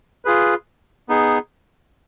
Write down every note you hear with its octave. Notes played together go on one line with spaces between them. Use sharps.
F4 G#4 B4
B3 D#4 G#4